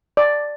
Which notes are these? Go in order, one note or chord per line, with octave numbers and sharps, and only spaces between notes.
D5